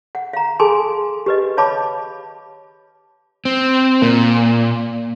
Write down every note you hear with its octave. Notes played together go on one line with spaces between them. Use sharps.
F#5
F5 A#5
G#4 A4 G#5 A5 C6
G4 B4 D#5
C#5 F5 A5 B5 D6
C4
A#2 A#3